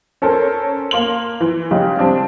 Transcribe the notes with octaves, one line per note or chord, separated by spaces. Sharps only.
C#4 A4 A#4 C5
A#3 C6 F#7
E3
C#3 G#3 G4
G3 C4 D4